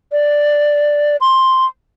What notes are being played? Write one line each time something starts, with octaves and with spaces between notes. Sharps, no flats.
D5
C6